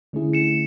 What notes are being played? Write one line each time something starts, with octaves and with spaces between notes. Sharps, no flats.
D3 A3 C#4 E4 G#4
C#7 E7